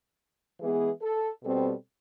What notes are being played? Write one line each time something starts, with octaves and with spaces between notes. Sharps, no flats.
E3 G#3 B3 G#4
A4
B2 G3 C4 A4